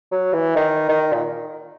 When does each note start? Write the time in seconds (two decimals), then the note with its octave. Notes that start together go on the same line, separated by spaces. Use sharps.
0.11 F#3
0.33 E3
0.56 D#3
0.89 D#3
1.13 A#2